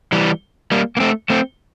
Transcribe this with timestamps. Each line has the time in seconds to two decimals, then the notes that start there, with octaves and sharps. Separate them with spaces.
0.12 E3 G3
0.71 G3 A#3
0.97 A#3
1.00 A3 C4
1.30 A3 C4